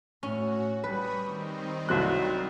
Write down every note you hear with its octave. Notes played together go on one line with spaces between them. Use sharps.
A2 C#4 F#4
G3 B4 B5 C#6 D#6
D#3 C4 D#4
C2 F#3 G3 F#6